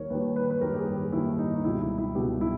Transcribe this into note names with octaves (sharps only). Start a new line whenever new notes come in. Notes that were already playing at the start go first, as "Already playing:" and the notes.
Already playing: D#2 D#3 G3 A#4 C#5
D#2 D#3 G3 B4
B4
B4
D#2 D#3 G3 A#4
G4
G#4
G4
D#2 D#3 G3 E4
D#4
D#4
C#2 B2 G3 E4
E4
E4
C#2 B2 G3 G4
E4